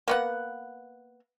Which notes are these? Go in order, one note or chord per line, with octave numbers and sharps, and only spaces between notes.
A#3 B3 F#5